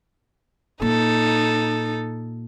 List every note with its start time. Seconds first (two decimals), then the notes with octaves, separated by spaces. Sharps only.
0.82 A#2 D#4 A4